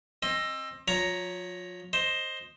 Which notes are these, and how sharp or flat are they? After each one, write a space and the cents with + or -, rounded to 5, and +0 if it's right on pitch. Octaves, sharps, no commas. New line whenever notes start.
C4 +30 D#5 +0
F3 +35 C#5 +10 A#5 +0
C5 +10 D#5 +0